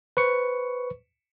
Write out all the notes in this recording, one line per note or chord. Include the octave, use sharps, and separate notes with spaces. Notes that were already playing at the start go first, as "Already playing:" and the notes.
B4 C5 C#6 C#7